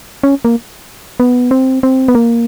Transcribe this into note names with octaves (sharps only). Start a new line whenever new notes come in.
C#4
A#3
B3
C4
C4
B3
A#3